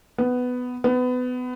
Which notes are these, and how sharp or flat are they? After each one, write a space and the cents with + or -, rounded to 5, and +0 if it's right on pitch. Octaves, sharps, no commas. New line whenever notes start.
B3 +10
B3 +25